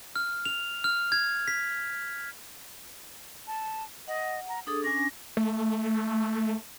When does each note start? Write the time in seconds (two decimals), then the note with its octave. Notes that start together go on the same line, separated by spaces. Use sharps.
0.16 F6
0.45 F7
0.84 F6
1.12 G#6
1.48 B6
3.47 A5
4.08 D#5 F#5
4.49 A#5
4.67 D4 G#4 A4 D#6
4.84 C#4 D4 G#5 A#6
5.37 A3